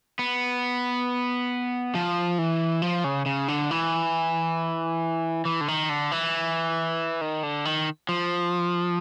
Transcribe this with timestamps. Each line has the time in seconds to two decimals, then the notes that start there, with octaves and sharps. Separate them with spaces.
0.19 B3
1.95 F3
2.38 E3
2.82 F3
3.04 C#3
3.26 C#3
3.48 D3
3.71 E3
5.45 E3
5.61 D3
5.68 D#3
5.89 D3
6.12 E3
7.21 D#3
7.43 D3
7.65 D#3
8.09 F3